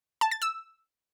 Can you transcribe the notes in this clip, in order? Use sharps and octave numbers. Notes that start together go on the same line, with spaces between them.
A5
A6
E6